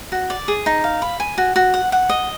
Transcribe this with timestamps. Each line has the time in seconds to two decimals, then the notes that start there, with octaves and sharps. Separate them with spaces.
0.12 F#4
0.30 D5
0.48 G#4
0.66 D#4
0.84 F5
1.02 B5
1.20 G#5
1.38 F#4
1.56 F#4
1.74 F#5
1.92 F#5
2.10 D#5